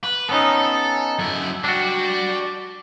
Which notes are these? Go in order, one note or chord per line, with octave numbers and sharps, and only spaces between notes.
B4
B3 C#4 D#4 A4
F#2 E4
G3 D4 F#4